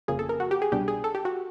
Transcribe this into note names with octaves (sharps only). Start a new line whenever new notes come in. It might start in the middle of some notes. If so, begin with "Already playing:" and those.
G1 F2 C#3 F3 A#3 G#4
A4
A#4
F#4
G4
G#4
C2 B2 G3 B3 D4 G4
G#4
A4
G4
F#4